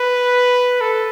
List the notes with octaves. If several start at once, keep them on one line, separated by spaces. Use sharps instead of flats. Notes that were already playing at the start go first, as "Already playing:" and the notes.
Already playing: B4
A4